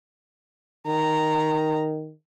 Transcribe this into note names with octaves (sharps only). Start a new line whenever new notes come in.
D#3 A#5